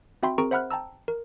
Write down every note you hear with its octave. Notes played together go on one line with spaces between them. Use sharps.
C4 F#4 E5 G5 B5 C6
C4 G#4 A#4 A#5 C#6 D7
C5 E5 F#5 B5 F6 F#6
G5 A5 A#5 E6
A#4